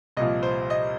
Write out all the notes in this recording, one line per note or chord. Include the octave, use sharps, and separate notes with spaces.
C2 A#2 F3 D#5
C5
D#5